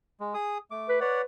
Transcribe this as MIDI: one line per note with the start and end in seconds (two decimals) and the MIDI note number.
0.20 0.34 56
0.34 0.58 68
0.34 0.58 87
0.71 1.00 57
0.71 1.00 86
0.89 0.98 71
1.01 1.24 71
1.01 1.22 73
1.01 1.22 74
1.01 1.22 78